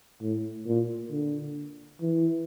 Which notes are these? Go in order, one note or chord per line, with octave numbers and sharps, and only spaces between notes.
A2
A#2
D3
E3